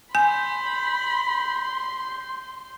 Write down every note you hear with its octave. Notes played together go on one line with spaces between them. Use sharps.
G#5 B5 C6 G6